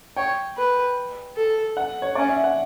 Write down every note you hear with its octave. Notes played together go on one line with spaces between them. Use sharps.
C#5 G5
B4
A4
F#5
C#5
C#4 D5
E5
F#5